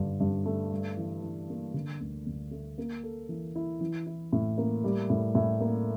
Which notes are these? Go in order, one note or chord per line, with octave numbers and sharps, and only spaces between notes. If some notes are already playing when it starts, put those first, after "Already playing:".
Already playing: G2 D3
G2
A3
G3
E3
E3
A#3
D3
D2
D2
A3
A#3
A4
E3
E4
E3
E4
A2
A#3
G3
A2
A2
A#3